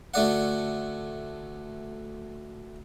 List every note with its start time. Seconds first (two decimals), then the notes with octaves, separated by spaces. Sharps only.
0.14 D2 A3 D5 F#5